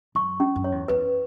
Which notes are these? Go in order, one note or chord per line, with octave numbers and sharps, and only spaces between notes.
F#2 C#6
C#4
F#2
C#5
E2
E2 B4